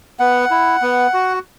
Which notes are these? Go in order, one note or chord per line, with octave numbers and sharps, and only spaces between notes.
B3 F#5
E4
B3
F#4